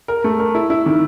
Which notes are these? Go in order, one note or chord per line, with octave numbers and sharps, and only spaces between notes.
A#4
A3
A#4
E4
E4
D#3